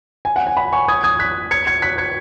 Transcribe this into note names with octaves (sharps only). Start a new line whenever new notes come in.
G#5
F#5
G#5
F#5 B5
G#5 C#6
D#6 G#6
D#6 G#6
F#6 B6
G#6 C#7
G#6 C#7
F#6 B6
G#6 C#7